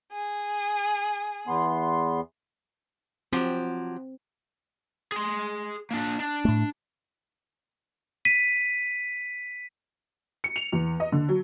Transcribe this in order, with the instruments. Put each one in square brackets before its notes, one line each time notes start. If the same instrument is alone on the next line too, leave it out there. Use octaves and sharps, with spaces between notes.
[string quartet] G#4
[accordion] E2 B3 C6
[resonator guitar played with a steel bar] F3 F#3 G4 [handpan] C4
[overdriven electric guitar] G#4 C6
A#3 D4
D4
[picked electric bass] A2 A3
[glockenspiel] B6 D#7
[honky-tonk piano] C#7
F7
E2
D#5
D3
F#3